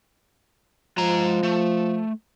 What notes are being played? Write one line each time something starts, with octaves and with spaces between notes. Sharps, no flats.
F3 G#3 A#5
A3